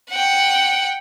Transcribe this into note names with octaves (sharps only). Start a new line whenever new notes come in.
F#5 G5